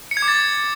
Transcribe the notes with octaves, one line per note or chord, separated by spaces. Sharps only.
C#7
G#6
D6
A6